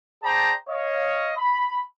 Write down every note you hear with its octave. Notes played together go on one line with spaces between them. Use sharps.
G#4 C5 D5 G5 A5 A#5
C#5 D#5 F5
B5